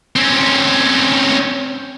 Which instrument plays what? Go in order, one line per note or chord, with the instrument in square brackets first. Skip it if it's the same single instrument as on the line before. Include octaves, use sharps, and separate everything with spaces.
[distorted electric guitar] C4 C#4